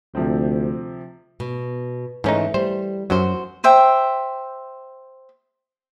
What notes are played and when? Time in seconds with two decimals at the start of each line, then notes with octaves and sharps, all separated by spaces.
0.15 D2 C3 F3 C4
1.40 B2
2.24 G#2 E3 A3 C#4 D#4
2.54 G3 C5
3.10 F#2 F#3 F#4 C5
3.64 C5 E5 G5